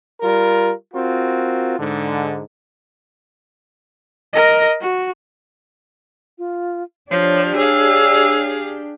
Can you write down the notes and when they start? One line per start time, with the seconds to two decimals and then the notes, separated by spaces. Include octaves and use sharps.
0.21 G3 F4 A#4
0.94 C4 F4 F#4 A#4
1.78 G#2 D3
4.33 A#4 D#5
4.81 F#4
6.38 F4
7.11 F3 D4 G4 C#5
7.56 G#4 C#5 F5 E6